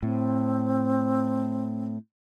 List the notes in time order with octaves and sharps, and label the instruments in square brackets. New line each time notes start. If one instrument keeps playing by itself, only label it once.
[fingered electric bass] A2 [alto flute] C4